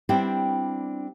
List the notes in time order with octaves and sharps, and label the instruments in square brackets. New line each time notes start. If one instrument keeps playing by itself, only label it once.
[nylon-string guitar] G3 B3 C4 D4 E4 G4